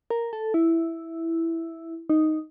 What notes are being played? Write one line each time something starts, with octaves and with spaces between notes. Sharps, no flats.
A#4
A4
E4
D#4